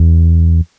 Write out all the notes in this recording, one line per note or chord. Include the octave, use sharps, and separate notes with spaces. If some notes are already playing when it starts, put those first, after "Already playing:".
Already playing: E2